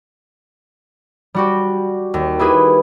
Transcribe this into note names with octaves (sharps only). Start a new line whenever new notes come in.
G3 F#4 G4
D#2
E4 G4 G#4 B4